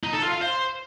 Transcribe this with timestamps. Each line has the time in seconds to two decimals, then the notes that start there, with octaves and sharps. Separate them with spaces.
0.03 D#4
0.13 A4
0.22 F4
0.32 F5
0.41 C5